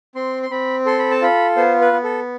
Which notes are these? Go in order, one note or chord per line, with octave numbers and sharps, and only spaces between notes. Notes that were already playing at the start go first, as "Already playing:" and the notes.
C4 C6
C6
C4 B5
A4 C6
B5
A5
F4 B5
B3 C5
B4
B3
A4